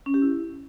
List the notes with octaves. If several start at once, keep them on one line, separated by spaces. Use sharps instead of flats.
C#4
G4
E4